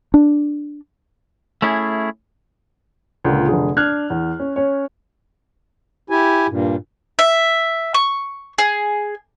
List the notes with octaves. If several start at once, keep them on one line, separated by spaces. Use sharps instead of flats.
D4
A3 C#4 E4 G#4
C#2 A#2 D3
F1 D3 G#4
D4 F6 F#6 G#6
E2
C#4
C#4 C#5
E4 G4 G#5
G2 A#2
E5
C#6
G#4